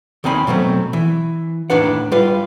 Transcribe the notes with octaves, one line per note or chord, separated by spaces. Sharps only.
D#2 D#3 C4 G#5 B5
B2 F#3 A3 C4
E3
D#2 A2 D4 B4 F#5
G3 F4 B4 F5